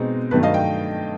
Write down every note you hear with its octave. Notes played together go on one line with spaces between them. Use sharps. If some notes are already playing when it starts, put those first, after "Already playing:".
Already playing: B2 G#3 C4 D#4
G2 D#3 F#3 A3 B4
D#5 F5
G5